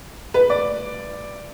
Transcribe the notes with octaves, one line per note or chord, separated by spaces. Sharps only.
B4
D5